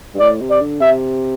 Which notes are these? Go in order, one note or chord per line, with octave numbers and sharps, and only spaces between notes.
G2
A2 D5
C3
D5
D3
C3 E5